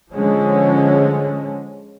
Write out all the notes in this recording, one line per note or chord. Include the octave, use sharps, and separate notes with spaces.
D3 F3 G#3 C#4